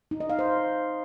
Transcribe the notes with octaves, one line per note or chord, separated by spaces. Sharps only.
D#4
D#5
F5
C5